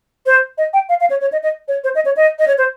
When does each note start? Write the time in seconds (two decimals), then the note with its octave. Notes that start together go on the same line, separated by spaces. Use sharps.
0.26 C5
0.58 D#5
0.73 G5
0.89 F5
1.00 F5
1.10 C#5
1.21 C#5
1.32 D#5
1.43 D#5
1.68 C#5
1.84 C5
1.95 D#5
2.05 C#5
2.17 D#5
2.39 D#5
2.48 C#5
2.58 C5